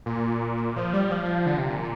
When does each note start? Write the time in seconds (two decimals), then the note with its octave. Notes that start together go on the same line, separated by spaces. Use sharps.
0.06 A#2
0.76 F3
0.93 G3
1.11 F3
1.46 D3
1.58 C3
1.69 A#2